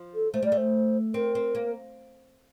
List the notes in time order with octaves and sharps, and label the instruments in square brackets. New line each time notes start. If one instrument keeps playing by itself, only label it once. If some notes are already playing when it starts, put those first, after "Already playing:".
Already playing: [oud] F3
[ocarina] A4
[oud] A3 [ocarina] C5
[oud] G3 [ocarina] D5
[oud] A3
[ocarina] C5
[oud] C4 [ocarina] A#4
[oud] C4
A#3